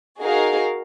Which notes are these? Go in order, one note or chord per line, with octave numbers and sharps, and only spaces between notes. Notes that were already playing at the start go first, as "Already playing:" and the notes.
D#4 F#4 G#4 A#4 F5